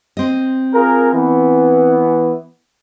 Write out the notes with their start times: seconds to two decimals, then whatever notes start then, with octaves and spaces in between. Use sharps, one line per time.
0.17 C4 D#5
0.73 F4 G#4 A#4
1.13 E3 B3